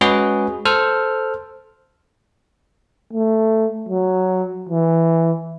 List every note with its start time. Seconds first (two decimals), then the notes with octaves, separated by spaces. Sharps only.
0.01 G#3 C#4 F#4 G#4 B4
0.65 A4 C5 F6
3.13 A3
3.89 F#3
4.69 E3